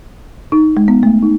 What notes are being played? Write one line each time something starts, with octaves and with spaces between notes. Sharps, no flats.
D#4
G#3
B3
A3
D#4